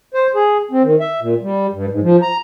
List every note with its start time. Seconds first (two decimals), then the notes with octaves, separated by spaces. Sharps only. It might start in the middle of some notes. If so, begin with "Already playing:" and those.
0.14 C5
0.35 G#4
0.71 C4
0.83 D#3
1.00 E5
1.21 A#2
1.42 G3
1.73 G2
1.90 G#2
2.02 F3
2.22 A#5